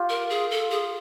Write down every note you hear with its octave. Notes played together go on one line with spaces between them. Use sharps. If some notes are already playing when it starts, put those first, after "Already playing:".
Already playing: F4 G4
A#4
G#4
A4
G#4